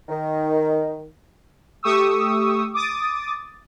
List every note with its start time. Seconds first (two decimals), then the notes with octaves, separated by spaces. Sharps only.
0.09 D#3
1.83 A3 G4 C#6 D#6 E6
2.74 D6 D#6 A6